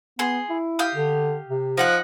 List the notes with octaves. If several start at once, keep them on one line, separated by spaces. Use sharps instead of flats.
B3 G#4 C6
E4
G4 F5 D#6
D3
C3
F3 D#4 F#5 F#6